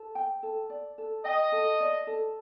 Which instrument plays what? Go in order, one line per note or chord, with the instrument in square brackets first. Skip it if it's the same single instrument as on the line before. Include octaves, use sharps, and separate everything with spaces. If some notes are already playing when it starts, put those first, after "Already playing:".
Already playing: [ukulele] A4
G5
A4
D5
A4
[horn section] D#5 [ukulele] G5
[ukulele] A4
D5
A4